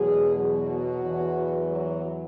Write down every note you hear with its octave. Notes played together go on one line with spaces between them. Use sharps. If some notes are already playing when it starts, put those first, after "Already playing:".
Already playing: E2 B2 F#3 G#3 G#4
F#3 F#4
E2 E3
F#3 F#4